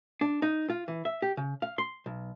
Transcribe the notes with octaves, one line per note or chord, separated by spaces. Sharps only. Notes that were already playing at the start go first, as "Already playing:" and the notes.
D4
D#4
F4
E3
E5
G4
C#3
F5
C6
B1